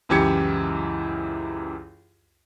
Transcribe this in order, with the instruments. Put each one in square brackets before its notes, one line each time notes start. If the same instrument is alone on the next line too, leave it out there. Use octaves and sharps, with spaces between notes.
[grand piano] C#2 F#2 E3 G4 G#6 C#7